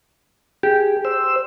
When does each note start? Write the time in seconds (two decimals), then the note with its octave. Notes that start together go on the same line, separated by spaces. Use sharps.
0.63 G4 G#4
1.05 C5 E6